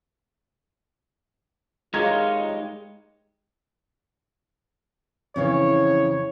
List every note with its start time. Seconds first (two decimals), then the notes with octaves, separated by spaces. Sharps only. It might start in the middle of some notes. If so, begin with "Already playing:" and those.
1.94 G#3 D#4 F4 G4 G#4 A#4 C#5 G#6
5.36 F2 C#3 E3 C#5